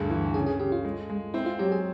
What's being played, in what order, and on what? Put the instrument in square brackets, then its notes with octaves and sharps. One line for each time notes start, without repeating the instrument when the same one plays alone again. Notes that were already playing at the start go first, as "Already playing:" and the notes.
Already playing: [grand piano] D2 G2 [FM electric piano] G#4
[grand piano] E3
[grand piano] C#3 [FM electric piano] G#4
[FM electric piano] G#4
[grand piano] C#3 [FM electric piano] G4
[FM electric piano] F4
[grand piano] G#3
G#3
[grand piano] C4 [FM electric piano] E4
[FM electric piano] F4
[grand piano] F#3 [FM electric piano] G4
[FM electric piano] G#4